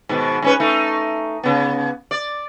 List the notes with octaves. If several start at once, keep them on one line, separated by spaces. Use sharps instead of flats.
G#2 B2 D#3
G#2 C#4 B4
A3 D#4
C#3 B3
D5